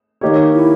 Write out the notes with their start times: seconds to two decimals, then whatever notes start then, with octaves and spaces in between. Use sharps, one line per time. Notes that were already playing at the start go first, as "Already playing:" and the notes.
0.21 D#3 A#3 D#4 G4 C#5
0.54 E4